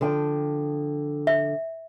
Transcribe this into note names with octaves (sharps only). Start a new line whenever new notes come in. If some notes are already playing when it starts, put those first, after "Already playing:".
D3 F3 G5
E5